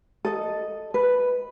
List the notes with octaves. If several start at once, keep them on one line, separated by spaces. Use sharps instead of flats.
A4 D#5
B4